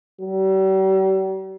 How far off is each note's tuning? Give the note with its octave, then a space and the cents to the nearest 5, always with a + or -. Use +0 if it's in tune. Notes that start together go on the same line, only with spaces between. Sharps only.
G3 -45